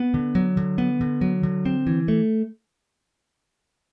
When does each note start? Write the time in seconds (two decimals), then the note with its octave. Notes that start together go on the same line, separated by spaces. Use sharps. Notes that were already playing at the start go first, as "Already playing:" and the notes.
Already playing: B3
0.14 D3
0.35 F#3
0.57 D3
0.78 B3
1.01 D3
1.21 F#3
1.43 D3
1.65 C4
1.87 E3
2.08 A3